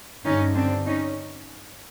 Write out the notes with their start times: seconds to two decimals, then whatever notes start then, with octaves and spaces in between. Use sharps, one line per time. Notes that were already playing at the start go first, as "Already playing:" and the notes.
0.25 G2 D3 C#4 D#4
0.56 C4 D4
0.85 C#4 D#4